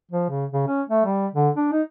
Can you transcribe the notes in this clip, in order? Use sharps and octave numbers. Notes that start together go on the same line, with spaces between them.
F3
C#3
C#3
C#4
A3
G3
D3
D4
D#4